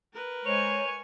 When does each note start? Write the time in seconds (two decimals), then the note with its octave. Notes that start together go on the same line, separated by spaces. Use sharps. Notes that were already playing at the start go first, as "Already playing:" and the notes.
0.13 A#4 B4
0.46 G#3 C5 C#5 G#5 C#6 F7